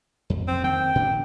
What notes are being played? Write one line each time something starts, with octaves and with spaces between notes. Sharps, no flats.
F2
C4
D#3 C4 G5
A#2 C#4 D4